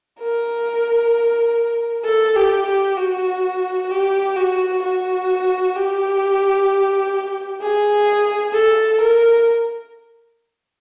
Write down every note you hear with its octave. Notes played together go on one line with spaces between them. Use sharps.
A#4
A4
G4
G4
F#4
G4
F#4
F#4
G4
G#4
A4
A#4